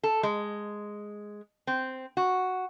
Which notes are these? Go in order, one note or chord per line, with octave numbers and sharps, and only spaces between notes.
A4
G#3
C4
F#4